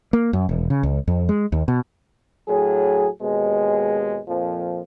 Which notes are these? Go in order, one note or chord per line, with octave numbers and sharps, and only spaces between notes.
A#3
F#2
E1
C#3
C#2
F2
G#3
D#2
B2
A2 F#3 G#4
D#2 B2 G#3
F2 A#2 F3